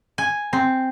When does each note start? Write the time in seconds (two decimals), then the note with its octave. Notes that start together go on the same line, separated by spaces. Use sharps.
0.18 G#5
0.53 C4